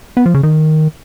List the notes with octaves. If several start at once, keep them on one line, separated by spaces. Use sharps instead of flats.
B3
F3
C#3
D#3